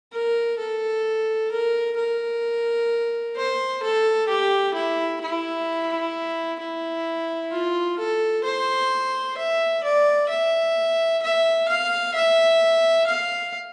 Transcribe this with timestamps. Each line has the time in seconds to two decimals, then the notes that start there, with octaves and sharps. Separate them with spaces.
0.13 A#4
0.58 A4
1.52 A#4
1.97 A#4
3.36 C5
3.82 A4
4.28 G4
4.74 E4
5.22 E4
6.60 E4
7.51 F4
7.99 A4
8.44 C5
9.37 E5
9.84 D5
10.29 E5
11.22 E5
11.68 F5
12.14 E5
13.07 F5